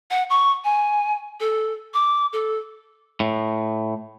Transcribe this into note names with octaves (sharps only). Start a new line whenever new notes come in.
F#5
C#6
G#5
A4
D6
A4
A2